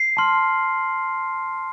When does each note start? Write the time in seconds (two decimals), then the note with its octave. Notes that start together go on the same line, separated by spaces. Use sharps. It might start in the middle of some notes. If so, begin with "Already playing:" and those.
Already playing: C7
0.17 A5 C6 F6